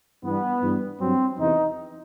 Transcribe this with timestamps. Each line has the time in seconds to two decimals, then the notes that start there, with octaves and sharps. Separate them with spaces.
0.23 G2 E3 G3 B3
0.62 G2 E3 G3
1.00 G2 F#3 C4
1.38 E2 C3 E3 D#4